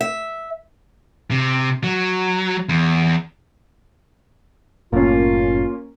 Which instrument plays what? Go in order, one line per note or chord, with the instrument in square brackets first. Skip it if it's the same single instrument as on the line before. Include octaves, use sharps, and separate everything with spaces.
[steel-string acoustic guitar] E5
[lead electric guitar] C3
F#3
E2
[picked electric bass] F#1 F#2 A2 [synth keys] A#3 C#4 [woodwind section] F4